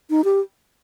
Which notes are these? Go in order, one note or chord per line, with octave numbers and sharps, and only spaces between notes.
D#4
G4